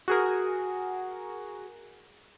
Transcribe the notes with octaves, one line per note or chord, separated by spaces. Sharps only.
F#4 G#4 A#4